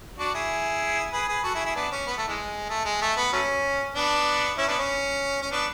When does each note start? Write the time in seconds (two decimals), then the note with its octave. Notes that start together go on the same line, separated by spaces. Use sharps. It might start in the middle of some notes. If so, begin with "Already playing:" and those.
0.18 D4 F#4
0.34 E4 G#4
1.13 G#4 B4
1.28 G#4 B4
1.44 F#4 A4
1.55 E4 G#4
1.65 E4 G#4
1.76 B3 D4
1.91 C#4
2.07 B3
2.18 A3
2.28 E3 G#3
2.69 A3
2.85 G#3
3.01 A3
3.17 B3
3.32 F#3 A3 C#4
3.95 B3 D4
4.58 C#4 E4
4.68 B3 D4
4.78 C#4
5.42 C#4
5.51 B3 D4